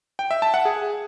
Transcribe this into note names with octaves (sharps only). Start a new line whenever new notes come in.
G5
E5
A5
F#5
G#4